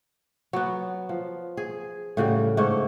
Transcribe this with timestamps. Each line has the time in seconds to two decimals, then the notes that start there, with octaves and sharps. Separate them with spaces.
0.53 F#3 B3
1.09 F3
1.57 G#4
2.17 A2 C#3 F#3 G3
2.57 G#2 A3 C#5